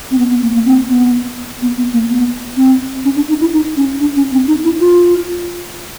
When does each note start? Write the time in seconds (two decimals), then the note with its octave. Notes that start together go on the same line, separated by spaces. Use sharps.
0.11 C4
0.18 B3
0.30 B3
0.42 A#3
0.54 A#3
0.65 C4
0.90 B3
1.62 B3
1.77 B3
1.93 A#3
2.09 B3
2.57 C4
3.05 C#4
3.16 D4
3.29 D#4
3.41 E4
3.52 D#4
3.77 C#4
4.01 D4
4.16 C#4
4.32 C4
4.48 D#4
4.64 E4
4.80 F4